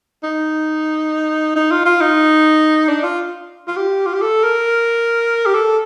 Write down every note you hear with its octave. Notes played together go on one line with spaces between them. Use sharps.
D#4
D#4
F4
F4
D#4
D4
F4
F4
G4
F4
G4
A4
A#4
G4
A4